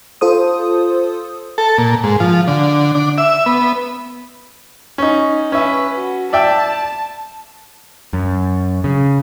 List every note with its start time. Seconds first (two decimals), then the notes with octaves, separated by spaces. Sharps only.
0.21 F4 A4 C5 D#6
1.58 A4
1.78 A#2
2.04 G#2
2.20 F3
2.48 D3
2.95 D4
3.18 E5
3.46 B3
4.98 C#4 D#4
5.52 C#4 B4 E5
5.95 F#4
6.33 D5 E5 G5 A5
8.13 F#2
8.84 C#3